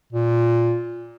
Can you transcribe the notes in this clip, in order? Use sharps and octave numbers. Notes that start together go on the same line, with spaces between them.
A#2